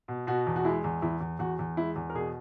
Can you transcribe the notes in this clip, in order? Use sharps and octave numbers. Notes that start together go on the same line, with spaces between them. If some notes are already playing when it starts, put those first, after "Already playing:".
B2
B2 F#4
E2
F#4
G#3 E4
E2
E2 E4
E2
E2 F#4
E2
G#3 E4
E2
A#4
B2 G#4